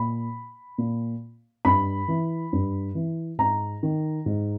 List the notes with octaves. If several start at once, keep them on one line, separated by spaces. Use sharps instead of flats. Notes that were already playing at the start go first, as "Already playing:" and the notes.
Already playing: A#2 B5
A#2
G2 B5
E3
G2
E3
G#2 A#5
D#3
G#2